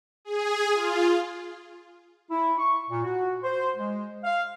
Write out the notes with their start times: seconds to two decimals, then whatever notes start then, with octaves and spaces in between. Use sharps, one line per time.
0.25 G#4
0.74 F4
2.30 E4
2.58 C#6
2.90 A#2
3.04 F#4
3.43 C5
3.76 G#3
4.24 F5